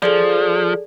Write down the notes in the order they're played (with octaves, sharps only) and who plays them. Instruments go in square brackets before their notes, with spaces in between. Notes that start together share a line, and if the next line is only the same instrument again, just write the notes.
[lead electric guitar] F3 [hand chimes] G#4 A4 D5